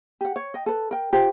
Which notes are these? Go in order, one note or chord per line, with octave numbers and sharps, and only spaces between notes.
G4 F#5
C#5
D#5 G5
A4 B4
A#4 G5
F4 G4 C5